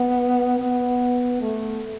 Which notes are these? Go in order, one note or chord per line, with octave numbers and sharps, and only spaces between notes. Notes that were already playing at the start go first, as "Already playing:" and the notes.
Already playing: B3
B3
A3